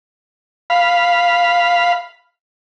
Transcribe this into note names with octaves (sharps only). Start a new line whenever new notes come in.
F5 B5